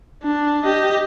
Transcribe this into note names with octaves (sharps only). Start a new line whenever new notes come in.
D4
G4 D#5